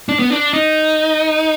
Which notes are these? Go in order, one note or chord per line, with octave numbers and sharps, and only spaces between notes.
D4
B3
D4
D#4